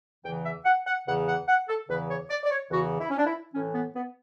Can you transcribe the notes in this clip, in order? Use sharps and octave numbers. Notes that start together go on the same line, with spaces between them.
E2 C#3 E3 G5
E5
F#5
F#5
E2 C#3 E3 F#5
F#5
F#5
A4
E2 C#3 E3 B4
C#5
D5
D5
C#5
E2 C#3 E3 F#4
E4
C#4
D4
E4
A2 E3 C#4
B3
B3